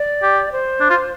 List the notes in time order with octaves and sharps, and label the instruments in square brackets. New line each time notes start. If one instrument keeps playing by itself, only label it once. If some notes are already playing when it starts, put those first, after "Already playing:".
Already playing: [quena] D5
[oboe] G4
[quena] C5
[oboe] D4
F4